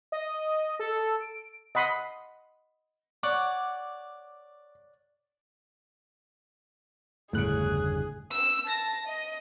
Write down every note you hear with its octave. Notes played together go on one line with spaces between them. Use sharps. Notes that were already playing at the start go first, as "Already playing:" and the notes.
D#5
A4
D7
D#5 F#5 B5 C6 D#6
C#5 D5 F#5 D6
G1 E2 A2 C#3 G#4 F#6
E6
A5 A#6
D#5